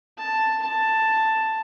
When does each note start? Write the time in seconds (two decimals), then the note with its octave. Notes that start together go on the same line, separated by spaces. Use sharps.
0.18 A5
0.62 A5